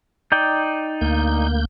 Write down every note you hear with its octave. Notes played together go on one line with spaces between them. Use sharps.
D#4 D5 G5
D2 A#3 G6